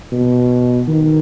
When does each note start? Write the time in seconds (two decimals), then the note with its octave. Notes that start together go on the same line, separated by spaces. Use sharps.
0.12 B2
0.88 D#3